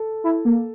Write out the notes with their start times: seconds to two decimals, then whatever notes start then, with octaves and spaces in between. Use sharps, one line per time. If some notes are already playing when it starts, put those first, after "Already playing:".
Already playing: A4
0.24 E4
0.45 A#3